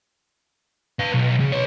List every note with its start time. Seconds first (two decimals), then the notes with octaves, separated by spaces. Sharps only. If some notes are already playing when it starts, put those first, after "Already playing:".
0.99 B4 F5
1.14 B1
1.40 C#3
1.52 B4 C#5